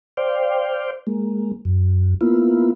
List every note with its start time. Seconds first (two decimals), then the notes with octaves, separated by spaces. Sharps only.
0.17 C5 D5 F5 G5
1.07 G#3 A#3
1.65 F#2
2.21 A#3 B3 E4 F4